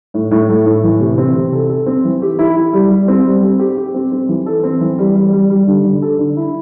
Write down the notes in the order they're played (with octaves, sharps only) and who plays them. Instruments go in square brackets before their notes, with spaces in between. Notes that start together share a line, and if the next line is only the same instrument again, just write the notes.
[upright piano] A2
A2
A3
A2
E3
C3
C4
C3
A4
A4
C4
E3
G4
E4
E4
G3
G3
C4
G3
C4
G4
G4
C4
C4
E3
A4
C4
E3
G3
G3
G3
G3
D3
D3
A4
D3
E4